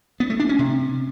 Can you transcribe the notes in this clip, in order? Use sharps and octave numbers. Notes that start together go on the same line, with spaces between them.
B3
A3
D4
C#4
C3